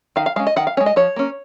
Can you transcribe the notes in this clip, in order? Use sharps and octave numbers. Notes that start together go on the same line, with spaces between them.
D#3 F5
F5
G#3 C#4 F5
D#5
D#3 F#5
F5
C#4 C#5
G#3
D#5
F3 C#5
A#3 C#4